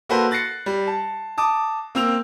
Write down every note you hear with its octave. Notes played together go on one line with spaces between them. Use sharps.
A#3 F#4 A4 B4 C5
F#6 A6 A#6 C7 C#7
G3
A5
A5 D6 D#6
A#3 C4 E6 F7